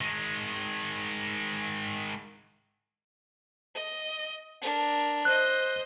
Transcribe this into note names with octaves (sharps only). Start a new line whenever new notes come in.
D#3 G#3
D#5
D4 A#4
C5 D#5 F#6